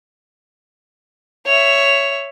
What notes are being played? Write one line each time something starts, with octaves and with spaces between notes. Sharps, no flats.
C#5 E5